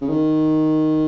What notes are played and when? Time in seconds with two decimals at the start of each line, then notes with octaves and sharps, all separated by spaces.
0.01 C#3
0.09 D#3